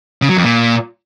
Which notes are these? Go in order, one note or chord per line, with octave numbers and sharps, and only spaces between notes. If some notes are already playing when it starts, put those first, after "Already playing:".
C#3
F#3
F2
A#2